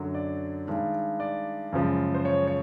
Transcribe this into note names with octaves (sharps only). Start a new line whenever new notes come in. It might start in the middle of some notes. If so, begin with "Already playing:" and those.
Already playing: F#2 D3 F#3
D5
G2 D#3 G#3
D5
F#2 C#3 F3 G#3
C5
C#5
C#5